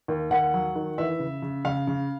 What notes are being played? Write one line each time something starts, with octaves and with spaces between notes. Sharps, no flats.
D#2
D#2 F#5
F#3
D#3
E3 E5
C#3
C#3
C#3 F5
C#3